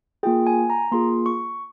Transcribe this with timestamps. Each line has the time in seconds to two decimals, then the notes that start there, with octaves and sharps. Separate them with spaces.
0.23 A#3 F4 G#4 G5
0.47 G#5
0.70 A#5
0.91 A#3 F4 G#4 C6
1.26 C#6